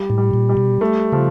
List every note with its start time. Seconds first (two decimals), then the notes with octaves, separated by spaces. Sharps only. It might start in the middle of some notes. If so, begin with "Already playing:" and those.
Already playing: G3
0.10 A2
0.18 G3
0.33 A#2
0.49 G3
0.57 B2
0.81 A3
1.12 C#3 F3